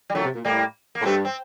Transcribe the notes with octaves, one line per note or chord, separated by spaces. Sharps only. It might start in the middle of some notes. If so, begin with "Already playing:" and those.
G3
A#2 D3 F#3 A3
C3
A#2
A2 G3 A#3
A#3
A2
G2 A3 C4
C4